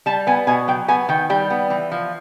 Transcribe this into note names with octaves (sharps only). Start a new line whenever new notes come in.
G3 A5
B3 G#5
B2 G#5
F#3 G5
B3 G#5
D#3 G5
G3 G5
B3
E3
F3